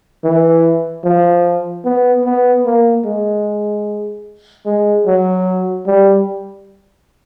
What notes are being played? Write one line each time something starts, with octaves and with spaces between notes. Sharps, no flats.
E3
F3
B3
B3
A#3
G#3
G#3
F#3
G3